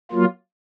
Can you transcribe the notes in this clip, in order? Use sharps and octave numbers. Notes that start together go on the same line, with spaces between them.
F#3 A#3 F4